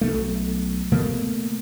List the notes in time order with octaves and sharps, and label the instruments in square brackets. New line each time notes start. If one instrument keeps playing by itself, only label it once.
[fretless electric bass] B1 A3
B2 A3 A#3